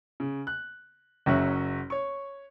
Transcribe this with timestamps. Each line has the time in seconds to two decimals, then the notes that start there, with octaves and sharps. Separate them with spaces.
0.20 C#3
0.47 F#6
1.26 F#1 F#3 C#4 E5 F#6
1.90 C#5 C#6